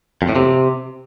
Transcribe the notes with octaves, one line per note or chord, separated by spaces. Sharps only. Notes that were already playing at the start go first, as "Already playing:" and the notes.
F2
A2
C3